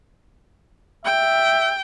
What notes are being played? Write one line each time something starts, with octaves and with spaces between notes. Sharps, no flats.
E5 G5